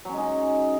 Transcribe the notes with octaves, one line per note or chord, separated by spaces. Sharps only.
F#3 G#3 C#4 D#4